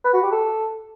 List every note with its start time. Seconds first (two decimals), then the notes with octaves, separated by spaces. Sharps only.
0.05 B4
0.14 F#4
0.23 G4
0.32 A4